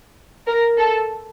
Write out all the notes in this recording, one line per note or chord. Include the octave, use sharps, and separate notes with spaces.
A#4
A4